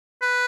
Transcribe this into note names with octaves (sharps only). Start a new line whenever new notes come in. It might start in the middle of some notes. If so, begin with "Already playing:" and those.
B4